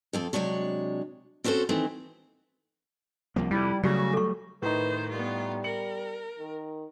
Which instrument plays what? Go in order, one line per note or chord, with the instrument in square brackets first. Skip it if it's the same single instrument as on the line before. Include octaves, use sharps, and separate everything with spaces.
[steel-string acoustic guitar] F2 C4 A4
C3 F#3 G#3 D4 C#5
C4 C#4 F#4 A4 C5
D#3 E3 A3 C4
[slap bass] C2 F3 A#3
[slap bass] F2 C3 [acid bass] G3 [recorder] E4
[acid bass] C#3 [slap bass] F#3 G3 A3 [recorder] F#4 [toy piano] G4 D5
[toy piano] A4 C#6
[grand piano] A2 D#4 [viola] D#3 C5 [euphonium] B4
[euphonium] G3 [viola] B3 F4
[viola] A#4 [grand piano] C#7 F#7
[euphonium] D#3